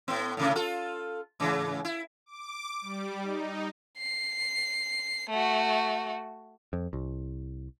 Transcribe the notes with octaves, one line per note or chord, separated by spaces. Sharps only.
A2 B3
A2 C3 A3
F4 A4
G#2 C#3 E3
E4
D6
G3
D#4
C7
A3 F#4
F2
C2